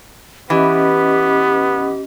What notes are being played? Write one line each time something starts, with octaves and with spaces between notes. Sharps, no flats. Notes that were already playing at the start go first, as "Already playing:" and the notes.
E3 B3 C#4 G4 D#5